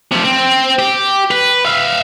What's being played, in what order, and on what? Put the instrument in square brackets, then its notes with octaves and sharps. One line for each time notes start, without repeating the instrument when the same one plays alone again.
[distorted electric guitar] C3 F3
C4
G4
B4
E5 F5